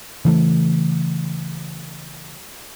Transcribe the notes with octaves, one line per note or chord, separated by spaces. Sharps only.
C#3 E3 A3